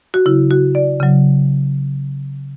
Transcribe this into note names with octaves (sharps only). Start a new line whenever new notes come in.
F#4
C#3 F#3 E4
F#4
D5
C#3 F#3